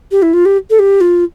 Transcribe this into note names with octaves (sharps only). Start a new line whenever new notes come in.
G4
E4
F4
G4
A4
G4
F4